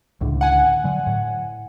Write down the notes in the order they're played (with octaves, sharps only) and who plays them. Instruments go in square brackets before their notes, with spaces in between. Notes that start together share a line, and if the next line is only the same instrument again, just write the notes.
[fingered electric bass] C#2 A2 D3
[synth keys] F#5 G#5
[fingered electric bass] D3 F#3
A2